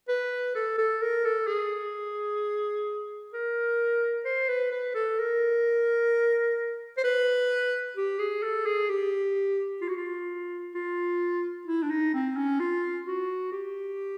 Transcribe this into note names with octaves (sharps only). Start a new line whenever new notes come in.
B4
A4
A4
A#4
A4
G#4
A#4
C5
B4
B4
A4
A#4
C5
B4
G4
G#4
A4
G#4
G4
F4
F#4
F4
F4
E4
D4
D#4
C4
C#4
F4
F#4
G4